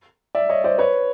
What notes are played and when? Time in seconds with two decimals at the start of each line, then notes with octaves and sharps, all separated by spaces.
0.35 D5 E5
0.49 C#5 D#5
0.64 C5 D5
0.78 B4 C#5